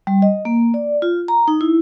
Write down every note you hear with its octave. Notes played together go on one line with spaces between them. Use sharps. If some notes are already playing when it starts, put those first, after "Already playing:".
G3
D#5
A#3
D5
F4
A#5
D#4
E4